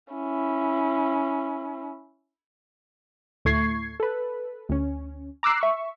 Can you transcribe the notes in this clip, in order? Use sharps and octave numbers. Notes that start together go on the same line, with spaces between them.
C#4 E4
D2 A2 A3 C#6 G#6 C7
A4 B4
D2 C#4
A#5 D6 E6 F#6 C7
E5 C#6